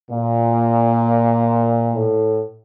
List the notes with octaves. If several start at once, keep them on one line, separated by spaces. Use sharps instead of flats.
A#2
A2